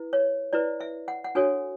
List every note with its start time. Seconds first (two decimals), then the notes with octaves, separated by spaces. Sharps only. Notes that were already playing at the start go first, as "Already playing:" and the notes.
Already playing: E4 B4
0.13 C#5
0.53 E4 B4 D5
0.80 E5
1.08 F#5
1.24 F#5
1.35 D4 F#4 A4 C#5 G#5